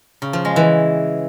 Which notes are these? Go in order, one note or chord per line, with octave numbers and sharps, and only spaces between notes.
C#3
F3
G#3
E3